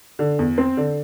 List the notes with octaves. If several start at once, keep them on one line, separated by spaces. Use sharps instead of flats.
D3
E2
C4
D3